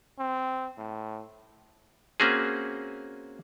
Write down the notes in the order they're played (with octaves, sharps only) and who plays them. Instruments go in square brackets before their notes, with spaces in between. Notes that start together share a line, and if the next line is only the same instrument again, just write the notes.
[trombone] C4
A2
[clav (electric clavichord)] A#3 C4 C#4 F#4 G#4